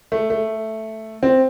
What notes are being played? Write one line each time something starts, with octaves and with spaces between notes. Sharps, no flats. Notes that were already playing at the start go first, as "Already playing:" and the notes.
A3
A3
C4